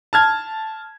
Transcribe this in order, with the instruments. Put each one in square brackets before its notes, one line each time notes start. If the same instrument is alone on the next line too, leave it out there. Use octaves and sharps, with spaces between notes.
[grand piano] A5 F6 G#6